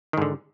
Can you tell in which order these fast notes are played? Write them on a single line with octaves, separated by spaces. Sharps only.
D#3 G#2 D3